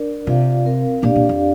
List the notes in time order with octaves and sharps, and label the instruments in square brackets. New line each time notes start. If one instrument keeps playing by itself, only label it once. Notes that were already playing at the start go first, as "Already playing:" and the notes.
Already playing: [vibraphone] D4 A#4 D5
[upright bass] C3 [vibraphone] F4 D5 F5
[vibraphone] C4 A#4 F5
[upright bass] A#2 [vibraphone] D4 G4 D5 F5
[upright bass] A#2
F2